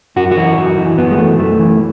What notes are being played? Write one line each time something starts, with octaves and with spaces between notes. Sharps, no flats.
F#2 F#4
F#4
E3
F#2
E3
F#2 B3
G#3
E3 A3
F#2 A3
E3